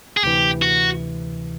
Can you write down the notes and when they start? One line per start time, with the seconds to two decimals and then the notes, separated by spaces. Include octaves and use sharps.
0.17 G#4
0.23 D2 C3 E3 G4
0.62 F#4